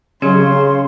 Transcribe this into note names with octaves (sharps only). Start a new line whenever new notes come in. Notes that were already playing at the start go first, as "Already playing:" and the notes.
C#3 F#3 C#4 G4 G#4 C6